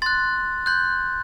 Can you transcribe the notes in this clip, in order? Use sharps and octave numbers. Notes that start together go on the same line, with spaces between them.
C6 F#6 A6
C6 F#6 G6